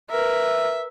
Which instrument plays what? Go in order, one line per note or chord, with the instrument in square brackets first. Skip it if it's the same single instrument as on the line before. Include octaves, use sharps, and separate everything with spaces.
[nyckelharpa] A#4 B4 [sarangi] E5